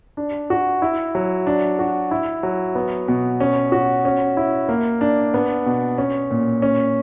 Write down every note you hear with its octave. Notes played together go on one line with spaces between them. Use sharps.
D4
F#4
E4
F#3
D4
F#4
E4
F#3
B3
B2
C#4
F#4
C#4
E4
A#3
D4
B3
B2
C#4
A#2
C#4